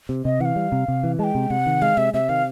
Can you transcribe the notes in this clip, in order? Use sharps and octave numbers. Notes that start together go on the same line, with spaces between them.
C3
C3 D#5
E3 F#5
F5
G3
C3
C3
E3
G#3 G5 A5
C3
C3 F#5
D#3
G#3 F5
C3 E5
C3 E5
D#3 F5